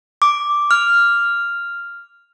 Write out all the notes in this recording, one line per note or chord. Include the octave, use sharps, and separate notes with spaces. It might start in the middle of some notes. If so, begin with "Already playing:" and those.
D6
F6